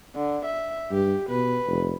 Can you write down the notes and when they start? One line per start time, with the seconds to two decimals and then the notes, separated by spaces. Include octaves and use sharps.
0.15 D3
0.45 E5
0.91 G2 G4
1.29 B2 B4
1.67 F1